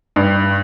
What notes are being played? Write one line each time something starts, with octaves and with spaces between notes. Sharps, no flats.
G2